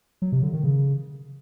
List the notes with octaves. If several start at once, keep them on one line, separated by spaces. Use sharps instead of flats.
F#3
C3
D3
D#3
C#3